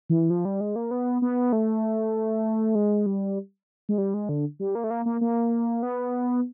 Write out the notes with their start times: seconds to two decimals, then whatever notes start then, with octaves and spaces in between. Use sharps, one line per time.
0.10 E3
0.30 F3
0.45 G3
0.61 G#3
0.76 A#3
0.91 B3
1.22 B3
1.53 A3
2.75 G#3
3.06 G3
3.89 G#3
3.98 G3
4.14 G#3
4.29 D3
4.60 G3
4.75 A#3
4.84 A3
4.90 A#3
5.06 A#3
5.21 A#3
5.83 B3